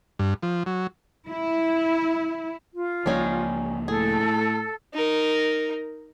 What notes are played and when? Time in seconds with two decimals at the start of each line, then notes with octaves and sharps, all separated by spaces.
0.19 G2
0.43 F3
0.66 F#3
1.29 E4
2.73 F4
3.06 C#2 F3 G3 A#3 C#4 D#4
3.88 A2 G#4 A4
4.94 D#4 A#4